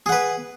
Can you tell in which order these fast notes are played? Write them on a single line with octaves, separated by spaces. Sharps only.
G#4 F#5 B4